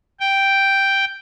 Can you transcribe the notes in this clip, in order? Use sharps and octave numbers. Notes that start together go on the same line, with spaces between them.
G5